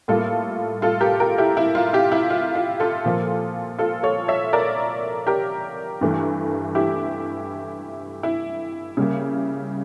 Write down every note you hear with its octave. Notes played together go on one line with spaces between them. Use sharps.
A2 G3 A#3 F4 A4
F4 A4
G4 A#4
G4 A#4
E4 G4
E4
F4
E4 G4
E4
F4
F4
F4 A4
A#2 F3 A#3
F4 A4
A4 C#5
C#5 E5
A#4 D5
G4 A#4
G2 E3 A3
E4 G4
E4
C#3 G3 A#3